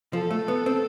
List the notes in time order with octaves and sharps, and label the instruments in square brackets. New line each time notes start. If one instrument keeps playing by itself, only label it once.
[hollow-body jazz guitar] F3 [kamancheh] A4
[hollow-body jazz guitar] A3
B3
C4